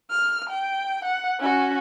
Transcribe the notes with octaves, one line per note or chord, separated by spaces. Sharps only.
F6
G5
F#5
C#4 F#4